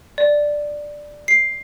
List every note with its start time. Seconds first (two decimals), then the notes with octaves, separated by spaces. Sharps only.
0.18 D5
1.28 C7